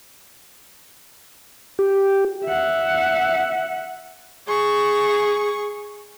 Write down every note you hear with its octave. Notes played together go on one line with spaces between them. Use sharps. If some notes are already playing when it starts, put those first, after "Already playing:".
G4
E5 F#5
G#4 C#6